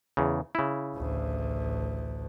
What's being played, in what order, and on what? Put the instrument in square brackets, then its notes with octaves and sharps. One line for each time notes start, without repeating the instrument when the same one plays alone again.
[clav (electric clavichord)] E2 C#3
C#3 E4
[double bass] A1 D2